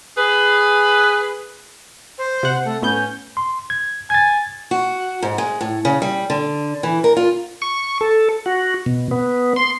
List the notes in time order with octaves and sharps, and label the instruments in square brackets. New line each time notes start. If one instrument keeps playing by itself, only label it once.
[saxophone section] G#4 B4
[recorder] C5
[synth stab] C3 F#5
[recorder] A3
[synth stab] A2 B3 G6 [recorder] C#4
[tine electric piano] C6
G#6
[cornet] G#5 [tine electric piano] G#6 A6
[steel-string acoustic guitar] F#4
G#2
G#3
A2
C#3
G3
D3
E3
A#4
F4
[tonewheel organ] C#6
A4
F#4
B2
B3
C6